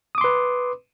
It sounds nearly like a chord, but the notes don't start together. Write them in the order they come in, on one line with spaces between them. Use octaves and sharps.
D#6 D6 C6 B4